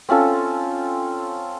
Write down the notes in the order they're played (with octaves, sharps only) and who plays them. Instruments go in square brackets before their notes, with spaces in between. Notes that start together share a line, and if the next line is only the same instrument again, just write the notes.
[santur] C4 C#4 F4 A4